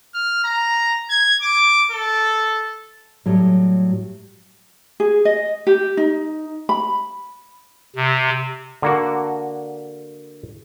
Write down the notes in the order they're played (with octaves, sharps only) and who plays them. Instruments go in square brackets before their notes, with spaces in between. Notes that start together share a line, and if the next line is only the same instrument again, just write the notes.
[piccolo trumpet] F6
A#5
G#6
D6
A4
[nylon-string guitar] A2 F#3 G3
[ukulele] G#4
D#5
G4
D#4
B5
[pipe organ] C3
[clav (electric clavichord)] D3 A#3 F#4